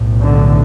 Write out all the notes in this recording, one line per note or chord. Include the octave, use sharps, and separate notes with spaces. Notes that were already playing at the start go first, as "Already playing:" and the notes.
Already playing: B1 A2
D3